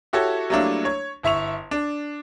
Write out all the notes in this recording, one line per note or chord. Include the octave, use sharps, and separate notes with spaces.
E4 F#4 G4 A4 C#5
F#3 G3 A3 A#3 D4 E4
C#5
G1 E4 E5 C#6 F7
D4